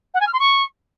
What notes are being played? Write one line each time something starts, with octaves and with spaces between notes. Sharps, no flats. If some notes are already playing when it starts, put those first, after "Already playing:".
F#5
G#5
F6
C6
C#6